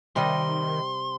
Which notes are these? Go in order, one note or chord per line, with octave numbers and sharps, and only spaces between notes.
C3 D#3 G3 D#5 C6